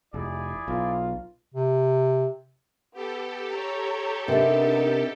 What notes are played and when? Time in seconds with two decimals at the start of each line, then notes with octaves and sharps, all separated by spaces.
0.14 F1 E4 G#4 D5
0.68 B1 F4
1.54 C3
2.93 B3 G4 A4
3.51 C#5 A#5
4.28 C3 B3 D4 D#4 A#4